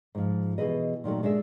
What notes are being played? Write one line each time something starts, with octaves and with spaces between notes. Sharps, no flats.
G#2 F3
B2 E3 G#4 B4 D#5
A#2 D#3 F#3 A3
G#3 D4 G#4 E5